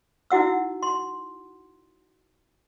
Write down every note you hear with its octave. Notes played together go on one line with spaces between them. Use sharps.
D#4 E4 F#4 F#5 E6
C6